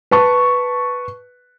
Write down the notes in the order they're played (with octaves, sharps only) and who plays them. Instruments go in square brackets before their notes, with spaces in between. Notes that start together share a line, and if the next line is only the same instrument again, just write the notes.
[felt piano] B4 A5 C#6